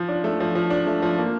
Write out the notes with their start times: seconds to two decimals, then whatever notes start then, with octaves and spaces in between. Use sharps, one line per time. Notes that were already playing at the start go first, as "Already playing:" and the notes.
Already playing: F3
0.09 D4
0.24 A3
0.40 F3
0.55 F3
0.70 D4
0.87 A3
1.02 F3
1.18 A#3